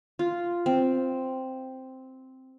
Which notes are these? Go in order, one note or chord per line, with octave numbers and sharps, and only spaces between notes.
F4
C4